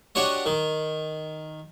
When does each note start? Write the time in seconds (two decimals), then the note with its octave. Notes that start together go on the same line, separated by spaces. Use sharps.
0.15 D4 F#4 G4 C#5 D#5
0.46 D#3